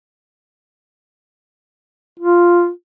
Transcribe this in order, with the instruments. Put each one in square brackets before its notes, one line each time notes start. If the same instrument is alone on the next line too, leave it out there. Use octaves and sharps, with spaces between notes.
[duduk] F4